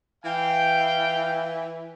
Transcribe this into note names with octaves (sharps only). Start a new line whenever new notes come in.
E3 F5 G5